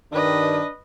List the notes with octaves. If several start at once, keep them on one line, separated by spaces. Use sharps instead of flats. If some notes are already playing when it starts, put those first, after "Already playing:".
G2 D#3 D4 B4 D#5